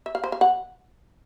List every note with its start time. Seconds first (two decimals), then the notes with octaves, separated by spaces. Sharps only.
0.06 E5
0.15 F5
0.24 C5
0.32 F5
0.41 F#5